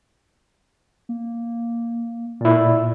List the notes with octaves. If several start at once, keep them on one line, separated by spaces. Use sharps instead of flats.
A#3
A#2 E4 D5